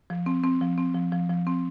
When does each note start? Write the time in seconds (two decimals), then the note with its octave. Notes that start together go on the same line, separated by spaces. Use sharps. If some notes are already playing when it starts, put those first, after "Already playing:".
0.10 F3
0.26 C4
0.44 C4
0.61 F3
0.78 C4
0.95 F3
1.12 F3
1.29 F3
1.47 C4